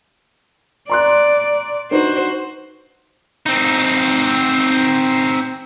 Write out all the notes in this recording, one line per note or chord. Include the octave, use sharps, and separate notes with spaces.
D5 A#5 C6 F#6
D4 D#4 F#4 B4 C5
C4 D#4